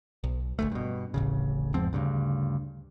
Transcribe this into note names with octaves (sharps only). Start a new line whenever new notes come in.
B1
F#1 D2 A3
G2 B2
D1 A1 C#3
E2 G#2 F3 C4
D2 G2 C#3